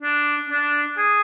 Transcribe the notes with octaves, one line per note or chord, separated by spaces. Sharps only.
D4
D4
G#4